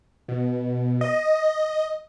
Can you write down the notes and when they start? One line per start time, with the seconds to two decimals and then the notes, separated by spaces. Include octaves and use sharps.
0.28 B2
1.01 D#5